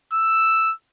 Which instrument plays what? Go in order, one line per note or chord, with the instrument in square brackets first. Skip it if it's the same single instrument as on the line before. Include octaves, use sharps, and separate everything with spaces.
[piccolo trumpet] E6